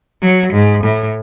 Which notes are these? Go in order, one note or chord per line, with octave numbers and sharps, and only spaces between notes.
F#3
G#2
A2